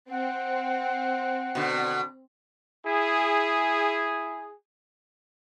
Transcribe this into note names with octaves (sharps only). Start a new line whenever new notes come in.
C4 F#5
B2 D3
E4 G#4